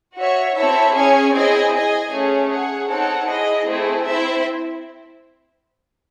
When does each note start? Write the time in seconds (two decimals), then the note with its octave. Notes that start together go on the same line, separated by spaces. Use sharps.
0.16 F#4 C#5 E5
0.55 C4 E4 A4 C#5 E5
0.94 C#4 G#4 C#5 G#5
1.33 C4 E4 G#4 D#5 G#5
1.72 G#4 D#5 G#5
2.11 A3 C#4 G#4 C#5
2.49 G#4 C#5 F#5
2.88 C4 D#4 A4 C#5 F#5
3.27 E4 G#4 D#5
3.66 A3 C4 E4 G#4
4.05 C4 E4 C5 E5